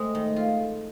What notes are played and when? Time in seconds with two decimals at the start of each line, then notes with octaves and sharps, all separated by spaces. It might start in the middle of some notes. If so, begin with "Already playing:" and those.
Already playing: G#3 A3 C4
0.15 D#3
0.36 F4